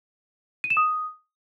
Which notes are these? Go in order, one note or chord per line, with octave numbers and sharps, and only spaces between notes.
D#7
E7
D#6